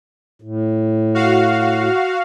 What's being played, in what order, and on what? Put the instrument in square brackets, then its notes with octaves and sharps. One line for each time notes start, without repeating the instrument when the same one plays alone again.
[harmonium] A2
[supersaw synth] F#4 F5